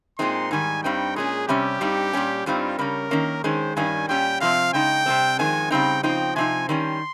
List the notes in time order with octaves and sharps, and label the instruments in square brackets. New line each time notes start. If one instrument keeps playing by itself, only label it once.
[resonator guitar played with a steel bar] A#2 G#3 C4 D#4 [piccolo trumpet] C6
[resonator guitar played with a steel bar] G#2 D#3 G3 [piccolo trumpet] G#5
[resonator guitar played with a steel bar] G2 G3 C4 D#4 [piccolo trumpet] G5
[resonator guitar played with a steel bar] A#2 G#3 C#4 [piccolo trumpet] G#4
[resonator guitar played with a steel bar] C3 G3 C#4 [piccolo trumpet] G4
[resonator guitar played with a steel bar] G2 G3 C4 D#4
A#2 G3 C#4
[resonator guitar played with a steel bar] G2 G3 C4 D#4 [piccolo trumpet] F4
[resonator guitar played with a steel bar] C#3 G3 C#4 [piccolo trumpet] A#4
[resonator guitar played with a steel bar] D#3 A#3 C#4
[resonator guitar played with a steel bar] D#3 G#3 C#4 [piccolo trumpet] C5
[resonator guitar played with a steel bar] G2 D#3 G3 C#4 [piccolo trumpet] G#5
[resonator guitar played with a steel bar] A#2 G3 C#4 [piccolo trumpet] G5
[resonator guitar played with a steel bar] C3 F3 C4 [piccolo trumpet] F5
[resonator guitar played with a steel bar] C#3 G#3 D#4 [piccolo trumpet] G5
[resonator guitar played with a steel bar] C3 D#3 G3 C4
[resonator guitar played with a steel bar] F2 D#3 G#3 C4 [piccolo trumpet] G#5
[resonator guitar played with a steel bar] C#3 G3 C4 D#4 [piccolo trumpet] G5
[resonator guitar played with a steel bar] C#3 F3 C4 D#4 [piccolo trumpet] G5
[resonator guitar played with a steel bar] C3 F3 C4 D#4 [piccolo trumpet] G#5
[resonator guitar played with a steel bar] D#3 G3 C#4 [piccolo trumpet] C6